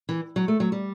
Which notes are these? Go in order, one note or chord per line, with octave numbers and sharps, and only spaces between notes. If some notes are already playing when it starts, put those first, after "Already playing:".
E3
F#3
A3
F#3
G3